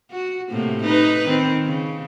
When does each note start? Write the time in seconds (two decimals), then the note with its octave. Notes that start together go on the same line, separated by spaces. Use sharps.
0.11 F#4
0.50 A2 C3 A#3
0.83 D#4 B4
1.25 D#3 C4
1.66 C#3